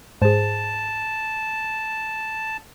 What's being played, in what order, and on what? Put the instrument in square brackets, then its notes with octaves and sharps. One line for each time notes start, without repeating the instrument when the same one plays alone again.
[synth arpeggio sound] G#2 [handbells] G#4 C5 [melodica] A5